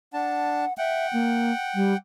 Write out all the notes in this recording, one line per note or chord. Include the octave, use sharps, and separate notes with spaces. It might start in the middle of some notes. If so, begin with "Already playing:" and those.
D4 F#5 A5
E5 F#5 G5
A#3
G3